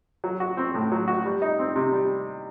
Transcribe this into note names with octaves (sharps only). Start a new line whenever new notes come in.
F#3
F#4
C4
A2
F#3
F#4
G3
D#4
C4
C3
G3